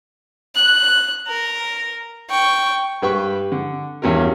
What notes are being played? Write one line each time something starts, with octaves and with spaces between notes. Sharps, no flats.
F#6
A#4
G5 C#6
G2 G3 B4 G5 C#6
D3
E2 G2 C#4 F#4 A#4